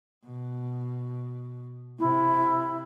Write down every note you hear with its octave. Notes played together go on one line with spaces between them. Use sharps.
B2
C3 E4